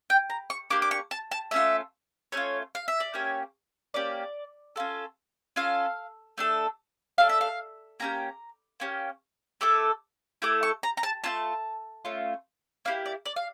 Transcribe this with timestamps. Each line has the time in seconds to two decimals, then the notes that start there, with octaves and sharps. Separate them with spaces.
0.10 G5
0.30 A#5
0.50 C#6
0.70 A#3 D4 G4 D6
0.82 D6
0.91 C#6
1.11 A5
1.31 A5
1.51 A3 C#4 F4 E5
2.32 A3 C#4 F4 C#5
2.75 F5
2.88 E5
3.00 D5
3.14 A#3 C#4 G4 C#5
3.94 A#3 C#4 G4 D5
4.76 C#4 F4 A4
5.56 C#4 F4 A4 F5
6.38 A3 D4 A4
7.18 A3 D4 A4 F5
7.29 E5
7.41 F5
8.00 A#3 C#4 G4 A#5
8.80 A#3 C#4 G4
9.61 A3 E4 A4 D6
10.42 A3 E4 A4 D6
10.63 C#6
10.83 A#5
10.97 A#5
11.03 A5
11.24 A3 C#4 F4 A5
12.05 A3 C#4 F4
12.85 A#3 E4 G4 F5
13.06 D5
13.26 D5
13.36 F5